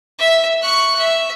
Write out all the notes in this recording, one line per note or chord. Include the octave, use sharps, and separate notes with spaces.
E5
C#6 F#6
E5